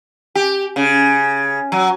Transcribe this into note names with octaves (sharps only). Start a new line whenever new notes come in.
G4
C#3
F#3